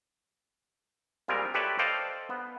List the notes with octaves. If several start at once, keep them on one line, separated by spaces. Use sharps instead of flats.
A#2 G3 G#3 C4 F4 A#4
G4 A4 B4 C#5 D5 E5
A4 C5 D5 D#5 F5 G5
B3